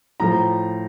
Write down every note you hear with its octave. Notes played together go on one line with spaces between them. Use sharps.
A2 F3 A3 A#5